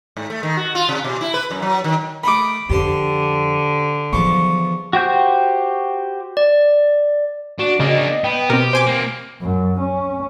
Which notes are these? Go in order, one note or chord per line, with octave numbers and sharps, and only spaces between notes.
G#2
A3
D#3
F#4
F4
C3
B2
E4
B4
F#2
F#3
D#3
A3 D#4 A#4 B5 D6
F2 D3 G4 C5
E2 F3 F#3 C#6 D6
F#4 G4 C5 G6
D5
D4 F#4
C#3 A#3 D4 D#5
B3 G5
B2 C4 G4 A#4
C5 G#5 D6
A#3 C4
F#2
C#4